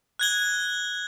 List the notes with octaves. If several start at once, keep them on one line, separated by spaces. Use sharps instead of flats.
F#6 G#6 G7